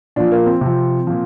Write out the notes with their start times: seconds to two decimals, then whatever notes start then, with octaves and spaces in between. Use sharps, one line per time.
0.16 A#2 F3 D4
0.32 A#3
0.46 C4
0.61 C3 F3
1.07 A#2 F3